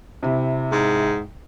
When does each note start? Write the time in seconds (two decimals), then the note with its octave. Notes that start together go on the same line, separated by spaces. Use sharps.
0.23 C3 E4
0.72 G#2